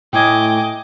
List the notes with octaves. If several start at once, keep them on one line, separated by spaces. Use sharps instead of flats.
A2 D#5 G5 G#5 D6 G#6